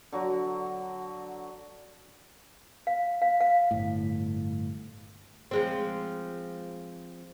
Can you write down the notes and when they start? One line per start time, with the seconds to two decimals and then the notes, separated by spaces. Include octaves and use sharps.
0.12 D3 F#3
2.87 F5
3.22 F5
3.41 F5
3.71 G1 A2
5.51 F3 G#3 C4